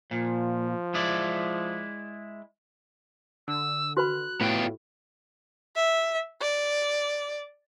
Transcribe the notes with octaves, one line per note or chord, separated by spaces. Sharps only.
A#2 F3
G#3 E4 D5
D3 E6
F#4 B4 B5 F#6
A2 B3 F4 G5
E5
D5